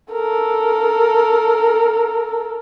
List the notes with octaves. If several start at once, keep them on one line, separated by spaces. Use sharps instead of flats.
A4 A#4